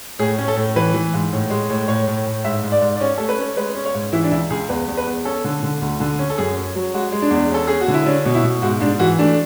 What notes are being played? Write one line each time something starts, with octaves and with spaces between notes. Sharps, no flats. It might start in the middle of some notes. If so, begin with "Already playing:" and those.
A2 G#4
C#4
A4
A2
E3 B4
E3
G#2
A2
G#3
A2
A2 C#5
A2
A2
G#2 E5
G#2
D5
G#2
D5
C#4 C#5
A3 A4
B4
C#4
G#3 B4
C#4
C#5
G#2
E3 E4
D4
C#2 E4
C#2 G#4
E2 B4
E2
B4
E2
C#4 A4
D3
D3
D2
D3
C#4
A4
F#2 G#4
C#4
F#3
G#3 F#4
G#3
D4
E2
C#4 A4
C#4 G#4
F#4
D3
E4
C#4 D4
B2
E4
B2
G#2 F#4
G#2 D4
E3 F#4
A3 D4